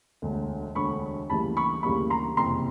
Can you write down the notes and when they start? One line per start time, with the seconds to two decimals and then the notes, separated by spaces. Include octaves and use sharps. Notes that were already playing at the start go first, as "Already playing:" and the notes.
0.22 E1 D2 D3
0.75 E1 D2 D3 B5 C#6
1.30 D2 C#3 E3 G3 A#3 A5 B5
1.57 B5 C#6
1.83 D2 C#3 E3 G3 A#3 B5 C#6
2.10 A#5 C6
2.37 F#1 F2 C3 E3 A#5 C6